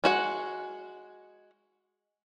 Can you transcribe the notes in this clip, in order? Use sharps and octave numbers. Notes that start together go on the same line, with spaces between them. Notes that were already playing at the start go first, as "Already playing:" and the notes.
G#3 F#4 F#5